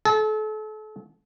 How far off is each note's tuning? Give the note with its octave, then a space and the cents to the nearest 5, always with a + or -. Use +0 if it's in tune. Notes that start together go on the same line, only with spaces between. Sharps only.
A4 -35